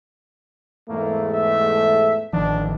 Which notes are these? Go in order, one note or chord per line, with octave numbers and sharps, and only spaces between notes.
E2 G#2 A3 A#3
E5
A1 D#3 F3 D4